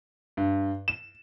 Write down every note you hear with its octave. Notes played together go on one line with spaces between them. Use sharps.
G2
E7